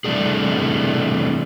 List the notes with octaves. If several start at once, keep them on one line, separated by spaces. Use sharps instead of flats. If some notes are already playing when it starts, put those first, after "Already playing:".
C3 E3 G3 A3 D4 G#4